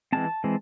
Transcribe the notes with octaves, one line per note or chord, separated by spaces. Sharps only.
E3 G#3 C4 A5
E3 G#3 C4